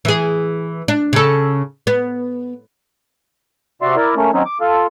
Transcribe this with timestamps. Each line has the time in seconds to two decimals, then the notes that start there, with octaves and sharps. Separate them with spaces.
0.05 E3 G#4
0.88 D4
1.13 C#3 A4
1.87 B3
3.82 C3 F#4 D5 E5 C6
3.96 E4 A#4 D5
4.16 A3 A#3 C#4
4.34 D#3 F#3 C4 C#4 D#4
4.45 D6
4.60 F4 A4